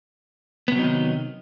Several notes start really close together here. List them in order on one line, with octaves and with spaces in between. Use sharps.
B3 C3 F#3 D#4 D#3